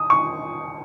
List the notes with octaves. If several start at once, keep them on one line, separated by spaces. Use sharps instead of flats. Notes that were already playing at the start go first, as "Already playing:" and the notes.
Already playing: D#6
C#6